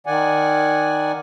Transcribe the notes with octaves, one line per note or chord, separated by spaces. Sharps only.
D#3 D5 F#5 G#5